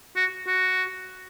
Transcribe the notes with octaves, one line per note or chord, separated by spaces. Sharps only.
F#4
F#4